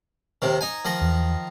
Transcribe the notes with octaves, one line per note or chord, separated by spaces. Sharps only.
D#2 C3 D#3
D#4 G#5
D#3 F3 D#5
E2